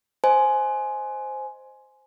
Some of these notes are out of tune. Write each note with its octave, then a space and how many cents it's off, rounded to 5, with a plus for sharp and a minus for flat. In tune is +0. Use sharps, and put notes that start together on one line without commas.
C5 +0 D#5 +0 G#5 +15